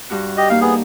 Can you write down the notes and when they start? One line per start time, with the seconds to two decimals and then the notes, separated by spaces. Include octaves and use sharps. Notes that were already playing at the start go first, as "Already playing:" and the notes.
0.09 G2 F#4 F#6
0.37 G4 D#5
0.50 A#3 D#4 G4 F5
0.62 B3 G#4